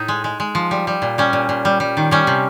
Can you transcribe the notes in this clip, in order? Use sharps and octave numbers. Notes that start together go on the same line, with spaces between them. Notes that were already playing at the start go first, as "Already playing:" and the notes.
Already playing: A2 D#4
G#3
G#3
G#3
F3
G3
G3
A#2
G3 C#4
A#2
A#2
G3
G3
D#3
G3 C#4
C3